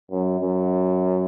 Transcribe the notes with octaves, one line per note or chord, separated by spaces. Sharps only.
F#2
F#2